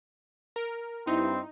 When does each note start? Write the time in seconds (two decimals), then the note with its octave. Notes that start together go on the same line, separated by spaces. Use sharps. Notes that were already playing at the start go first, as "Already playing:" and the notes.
0.56 A#4
1.07 G2 C4 D#4 E4